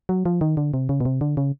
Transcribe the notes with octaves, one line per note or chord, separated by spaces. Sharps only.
F#3
F3
D#3
D3
C3
C#3
B2
C3
D3
C#3